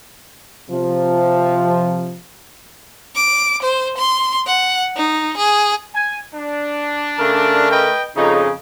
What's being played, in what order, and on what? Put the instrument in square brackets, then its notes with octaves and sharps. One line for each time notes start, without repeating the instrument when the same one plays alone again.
[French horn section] C3 F3
[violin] D6
C5
C6
F#5
D#4
G#4
[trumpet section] G#5
D4
[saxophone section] C#3 A3 A#4
[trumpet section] B4 D#5 G5
[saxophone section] F2 C#3 [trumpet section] D#4